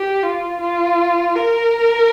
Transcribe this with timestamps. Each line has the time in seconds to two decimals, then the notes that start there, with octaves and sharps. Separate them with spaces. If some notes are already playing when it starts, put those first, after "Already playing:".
Already playing: G4
0.23 F4
0.61 F4
1.36 A#4